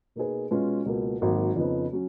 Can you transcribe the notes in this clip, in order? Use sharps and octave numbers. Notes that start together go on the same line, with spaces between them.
B2 A#3 D#4 G#4 B4
B2 G#3 C#4 F4 B4
C#2 B2 A#3
G#1 G#2 F#3 A#3
F2 C#3 F3 B3 D#4
F#3 C#4